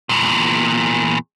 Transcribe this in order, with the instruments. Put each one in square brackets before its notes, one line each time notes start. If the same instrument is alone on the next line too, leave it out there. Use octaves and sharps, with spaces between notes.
[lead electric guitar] E2 A#2